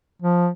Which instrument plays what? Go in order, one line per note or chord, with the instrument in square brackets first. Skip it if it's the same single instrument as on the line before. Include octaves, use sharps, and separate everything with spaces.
[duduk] F3